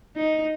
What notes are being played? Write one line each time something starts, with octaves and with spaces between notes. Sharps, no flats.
D#4